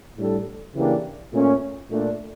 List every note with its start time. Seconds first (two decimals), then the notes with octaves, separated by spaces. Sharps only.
0.17 A2 G3 D4 A4
0.74 C#3 E3 A#3 D4 G4
1.31 A#2 A3 C#4
1.89 A#2 A3 D4